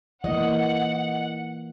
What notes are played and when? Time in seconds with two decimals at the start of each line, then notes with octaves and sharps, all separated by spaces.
0.24 E3 A#3 D#5 F#5